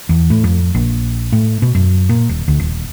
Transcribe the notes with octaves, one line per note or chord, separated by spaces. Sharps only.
E2
A2
F2
A#1
A2
B2
F#2
A#2
D#1
D2
D#1